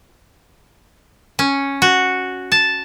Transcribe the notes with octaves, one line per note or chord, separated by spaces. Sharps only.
C#4
F#4
A5